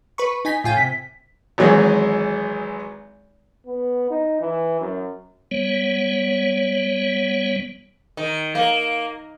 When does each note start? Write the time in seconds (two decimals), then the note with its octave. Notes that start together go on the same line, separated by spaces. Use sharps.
0.18 B4 B5 C#6
0.45 D#4 G#5 B6
0.64 A2 F4 G5 G#5
0.77 C3 B6
1.58 G#1 E3 F#3 G#3 G#4
3.66 B3
4.10 D#4
4.40 E3
4.80 F#2
5.51 G3 B3 C#5
8.17 D#3
8.55 A#3